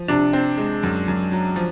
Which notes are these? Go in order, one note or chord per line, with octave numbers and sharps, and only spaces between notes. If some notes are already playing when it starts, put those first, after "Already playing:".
Already playing: F3
C3 D4
C4
G#3
F#2
F#2
F#3
F3